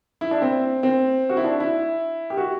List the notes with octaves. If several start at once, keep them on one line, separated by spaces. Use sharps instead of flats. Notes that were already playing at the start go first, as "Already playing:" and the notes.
E4
D4
C4
C4
F#4
E4
D4
E4
G4
F#4